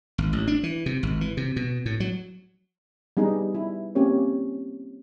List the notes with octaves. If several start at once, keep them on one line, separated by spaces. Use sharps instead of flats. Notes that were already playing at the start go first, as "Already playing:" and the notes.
G#1
A1
D4
E3
C3
G#1
E3
C3
B2
A2
F#3
G3 B3 D#4 G#4
E4
A#3 C4 C#4 G4 C#5